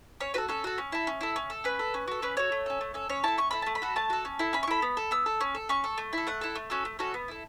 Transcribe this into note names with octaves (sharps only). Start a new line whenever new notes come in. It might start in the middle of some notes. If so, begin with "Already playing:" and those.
C#4 C#5
F#4 A4 B4
C#4 A4
F#4 A4
C#4
E4 A4
C#4
E4 A4
C#4
A4
C#4 B4
A4
C#4
F#4 A4
C#4 B4
F#4 A4 C#5
A3
C#4 A4
A3
C#4 A4
C#4 C#5
E4 A4 A5
C#4 C#6
E4 A4 B5
A3 A5
B5
F#4 A4
A3 A5
F#4 A4
C#4
E4 A4
C#4 B5
C#6
E4 A4 B5
B3
A4
B3 E6
A4
C#4
A4
C#4 C#6
A4
A3
E4 A4
A3 F#5
E4 A4
A3
C#4 F#4 A4
A3
C#4 F#4 A4
B3
E4 A4